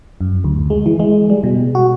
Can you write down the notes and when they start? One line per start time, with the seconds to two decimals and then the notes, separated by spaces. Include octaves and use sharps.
0.21 F#2
0.44 D2
0.70 G#3
0.86 E3
1.00 G#3
1.30 G3
1.43 B2
1.75 F#4